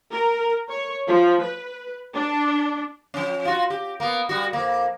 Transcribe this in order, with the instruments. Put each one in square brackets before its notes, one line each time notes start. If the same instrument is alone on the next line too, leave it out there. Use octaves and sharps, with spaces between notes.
[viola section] A#4
C#5
F3
B4
D4
[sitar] F3 C#4
F4 F#4
G4
A#3 B3
G3 F#4
F2 A#3